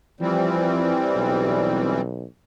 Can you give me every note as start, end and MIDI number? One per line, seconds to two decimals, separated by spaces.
0.20 2.01 52
0.20 0.95 53
0.20 2.01 55
0.20 2.01 60
1.15 2.24 35